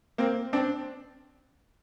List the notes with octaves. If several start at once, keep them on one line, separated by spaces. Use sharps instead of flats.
A#3 C4
C4 D4